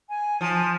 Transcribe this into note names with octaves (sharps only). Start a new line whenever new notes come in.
G#5
F3 A5